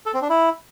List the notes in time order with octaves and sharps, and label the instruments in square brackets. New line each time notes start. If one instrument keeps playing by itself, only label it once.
[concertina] A4
C4
D4
E4